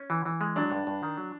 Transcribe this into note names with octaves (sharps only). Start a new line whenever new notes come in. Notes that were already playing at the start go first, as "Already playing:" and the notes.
Already playing: C#4
E3
E3
G#3
F#3 D4
G2
G2
D#3
F#3